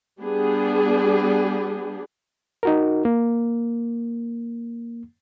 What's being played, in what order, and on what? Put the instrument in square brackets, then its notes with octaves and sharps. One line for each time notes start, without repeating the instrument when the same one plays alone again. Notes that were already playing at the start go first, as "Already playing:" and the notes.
[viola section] G3 B3 D4 G4 G#4
[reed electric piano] D#4 F#4 A#4
A#3